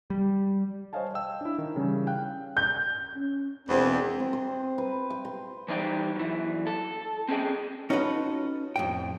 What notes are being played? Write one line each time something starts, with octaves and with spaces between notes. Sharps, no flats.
G3
C5 C#5 D#5 F5 G#5 A5
D#5 F5 G5 E6
D4 E4
D#3
C#3 E3 G3 C#4
F5 G5 F#6
G6
C#4
E1 E2 C4
C4
C5
B4
G5
C6
E3 G3 D#4 C5 D#5 G5
F#2 E3
A4
C4 C#4 G#4 A#4 D#5 G5
C#4 D#4 F4 F#4 A4 B4
F2 A2 G5